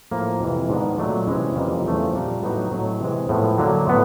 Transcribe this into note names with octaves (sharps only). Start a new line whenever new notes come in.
A2 F3 A#3
F2 C3 E3
G#2 D#3 G#3 B3 D4
A#2 F#3 A3 D4
C3 E3 G#3 C#4 E4
F2 C#3 E3 G3 A#3
E2 C#3 F3 A3 C4
A#2 G3 A#3 D4
A2 F#3 B3 D#4 F#4
A2 F#3 A3
C3 E3 G#3
A2 F3 G#3 B3
D3 F#3 A#3
A2 F#3 B3